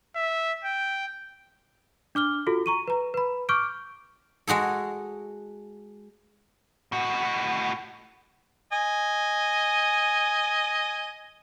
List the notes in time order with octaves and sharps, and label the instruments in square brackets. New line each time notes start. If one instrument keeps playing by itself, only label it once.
[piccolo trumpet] E5
G5
[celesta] D4 D6 F6 G7
F4 F#4 A4
A#5 C#6 D#7
B4 A#5
B4 B5
C#6 D6 F6 G6 D7
[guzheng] G#3 F#4 G#4 A4
[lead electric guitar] A2 F#4
[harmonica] D#5 G#5